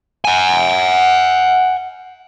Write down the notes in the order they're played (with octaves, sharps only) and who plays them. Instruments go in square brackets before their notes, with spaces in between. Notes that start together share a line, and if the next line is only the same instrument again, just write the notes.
[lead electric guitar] F#5 G#5